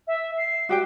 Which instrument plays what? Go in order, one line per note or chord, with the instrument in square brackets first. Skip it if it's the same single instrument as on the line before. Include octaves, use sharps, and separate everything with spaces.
[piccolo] E5
C7
[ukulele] F#4 G4 G5